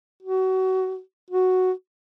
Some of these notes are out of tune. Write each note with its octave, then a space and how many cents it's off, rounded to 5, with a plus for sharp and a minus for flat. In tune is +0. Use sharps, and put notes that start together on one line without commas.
F#4 +25
F#4 +0